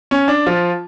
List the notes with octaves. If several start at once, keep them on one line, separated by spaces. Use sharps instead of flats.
C#4
D4
F3 F4